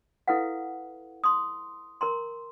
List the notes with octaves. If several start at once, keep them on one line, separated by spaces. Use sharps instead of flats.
E4 A4 B4 F5 F#5
C6 D#6
A#4 A#5 C6